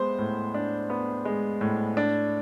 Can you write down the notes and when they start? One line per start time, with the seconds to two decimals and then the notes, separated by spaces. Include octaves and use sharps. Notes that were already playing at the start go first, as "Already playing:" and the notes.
Already playing: G#3 B3 C5 C6
0.19 A2
0.54 D4
0.90 B3
1.25 G#3
1.61 A2
1.97 D4